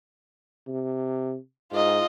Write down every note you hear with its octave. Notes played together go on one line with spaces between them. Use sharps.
C3
G#2 F4 D#5